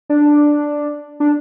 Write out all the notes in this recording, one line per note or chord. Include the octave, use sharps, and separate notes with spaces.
D4
D4